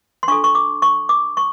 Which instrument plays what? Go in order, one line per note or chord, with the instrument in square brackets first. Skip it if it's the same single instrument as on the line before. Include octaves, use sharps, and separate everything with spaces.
[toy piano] C6
D4 F4 A4 C#6
C#6
D6
C#6
D6
C#6